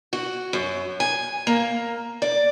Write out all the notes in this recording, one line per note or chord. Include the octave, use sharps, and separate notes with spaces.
F#4
F#2
G#5
A#3
D5